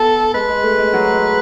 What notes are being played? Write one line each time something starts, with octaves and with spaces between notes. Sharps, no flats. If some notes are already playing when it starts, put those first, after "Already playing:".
Already playing: B3 A4
G#3 B4
G#3
A3
G#3
F#3
G#3